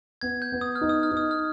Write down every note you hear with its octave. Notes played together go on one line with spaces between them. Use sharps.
B3 G#6
G6
B3
D#6
F6
D#4
D#6
F6
D#4
D#6
F6